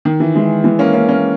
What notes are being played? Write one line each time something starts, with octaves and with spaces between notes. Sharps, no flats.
D#3
E3
E3 G#3
E3 G#3
A#3 C#4
A#3 C#4
A#3 C#4